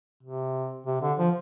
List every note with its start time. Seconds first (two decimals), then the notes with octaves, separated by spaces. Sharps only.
0.23 C3
0.86 C3
1.02 D3
1.18 F3